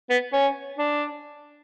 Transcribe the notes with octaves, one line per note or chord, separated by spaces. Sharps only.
B3
C#4
D4